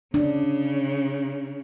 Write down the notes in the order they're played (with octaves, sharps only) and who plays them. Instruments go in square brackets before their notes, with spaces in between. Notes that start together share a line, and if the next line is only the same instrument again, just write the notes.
[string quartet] C#3 [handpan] D4